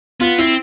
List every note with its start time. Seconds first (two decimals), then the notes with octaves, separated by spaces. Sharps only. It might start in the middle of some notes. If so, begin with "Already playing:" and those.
0.21 B3 F4
0.38 C4 E4